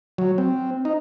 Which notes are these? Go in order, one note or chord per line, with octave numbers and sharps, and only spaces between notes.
F#3
C4
D#4